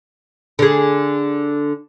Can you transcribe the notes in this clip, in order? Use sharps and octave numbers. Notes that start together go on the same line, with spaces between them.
D3 G#4